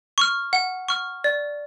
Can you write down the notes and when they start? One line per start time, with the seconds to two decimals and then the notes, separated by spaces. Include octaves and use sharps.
0.18 C#6 F6
0.53 F#5
0.89 C#6 F6
1.24 D5